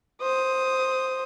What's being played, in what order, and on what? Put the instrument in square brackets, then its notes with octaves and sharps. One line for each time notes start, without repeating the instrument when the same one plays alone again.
[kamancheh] C5 D#6